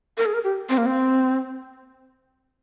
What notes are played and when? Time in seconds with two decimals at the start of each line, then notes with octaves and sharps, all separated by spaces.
0.18 A#4
0.26 G#4
0.34 A#4
0.44 G4
0.69 C4
0.78 A#3
0.86 C4